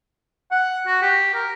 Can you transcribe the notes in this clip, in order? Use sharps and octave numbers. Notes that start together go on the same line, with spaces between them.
F#5
F#4
G4
A#4